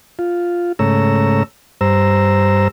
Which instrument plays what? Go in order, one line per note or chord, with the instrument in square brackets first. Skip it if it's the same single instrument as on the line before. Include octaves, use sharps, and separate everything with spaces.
[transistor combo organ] F4
G#2 C#3 A3 C#5 A#5 E6
G2 C5 A#5 E6